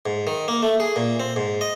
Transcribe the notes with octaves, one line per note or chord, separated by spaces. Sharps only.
G#2
D#3
A#3
A3
G#4
A#2
C4
G#2
D#5